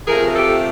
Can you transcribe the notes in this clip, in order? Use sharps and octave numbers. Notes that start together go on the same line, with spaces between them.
C3 F3 A3 G#4 A#4
A#4
G4 A4